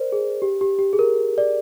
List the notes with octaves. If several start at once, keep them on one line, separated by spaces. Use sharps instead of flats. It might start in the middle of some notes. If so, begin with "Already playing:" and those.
Already playing: A#4 C5 D5
G#4
G4
G4
G4
G#4
A#4
D5